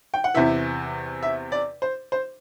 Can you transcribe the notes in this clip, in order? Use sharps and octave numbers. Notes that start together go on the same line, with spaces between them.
G5
F#5
E2 C3 E3 E5
E5
D5
C5
C5